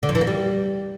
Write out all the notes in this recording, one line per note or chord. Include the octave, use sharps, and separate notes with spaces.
D3
F2
E3
A#3
G3